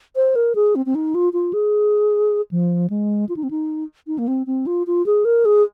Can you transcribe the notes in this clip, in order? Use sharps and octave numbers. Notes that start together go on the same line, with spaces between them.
C5
A#4
G#4
C4
C4
D#4
F4
F4
G#4
F3
G#3
F4
D#4
C4
D#4
D#4
A#3
C4
C4
F4
F4
G#4
A#4
G#4